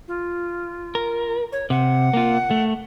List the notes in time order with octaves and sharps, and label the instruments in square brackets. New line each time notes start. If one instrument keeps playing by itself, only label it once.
[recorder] F4
[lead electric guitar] A#4
[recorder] C#5
[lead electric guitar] C3 [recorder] F#5
[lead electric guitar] A#3 F4
A3